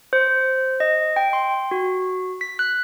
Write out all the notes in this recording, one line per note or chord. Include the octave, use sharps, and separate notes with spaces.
C5
D#5
G5
C6
F#4
B6
F#6